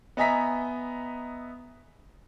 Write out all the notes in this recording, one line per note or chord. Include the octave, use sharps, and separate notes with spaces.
B3 D#5 E5 G#5 A#5 B6